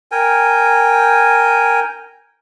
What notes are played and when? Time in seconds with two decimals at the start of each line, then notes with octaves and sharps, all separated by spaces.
0.12 A#4 G5 G#5